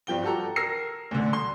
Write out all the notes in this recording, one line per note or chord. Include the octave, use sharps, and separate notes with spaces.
G2 F3 G5 G7
F#4 G4 A4 A#5
A#4 E6 A#6 C7
D2 D3
C6